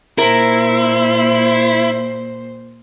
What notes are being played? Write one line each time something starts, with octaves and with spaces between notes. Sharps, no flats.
A#2 E4 A#4 C5